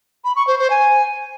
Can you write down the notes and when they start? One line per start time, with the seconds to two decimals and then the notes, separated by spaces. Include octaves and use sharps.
0.24 B5
0.36 C#6
0.47 C5
0.59 C5
0.70 G#5